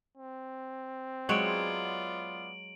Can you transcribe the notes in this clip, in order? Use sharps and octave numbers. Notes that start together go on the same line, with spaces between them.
C4
F#3 G#3 B3 F4 C#5 D5 D7 F#7